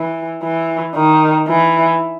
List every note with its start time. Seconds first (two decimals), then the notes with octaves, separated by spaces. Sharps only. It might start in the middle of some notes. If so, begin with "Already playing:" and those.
Already playing: E3
0.43 E3
0.95 D#3
1.47 E3